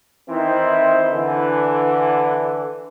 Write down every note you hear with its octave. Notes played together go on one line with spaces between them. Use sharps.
D#3 E3 C4 D#4 E4 C5
D3 E3